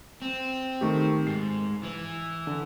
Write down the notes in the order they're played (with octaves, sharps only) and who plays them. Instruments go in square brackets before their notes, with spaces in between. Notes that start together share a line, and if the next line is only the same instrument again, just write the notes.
[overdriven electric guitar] C4
[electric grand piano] D#3 A3 G4
[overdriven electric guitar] G#2 [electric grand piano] C7
[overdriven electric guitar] E3
[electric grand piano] D3